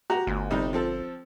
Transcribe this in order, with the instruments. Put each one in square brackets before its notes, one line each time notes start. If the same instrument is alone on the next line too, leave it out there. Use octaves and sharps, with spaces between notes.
[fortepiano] F#4 G4 A#5
[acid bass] G1 [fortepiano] D2
[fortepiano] C3 G3 D#4
F3 C4 A4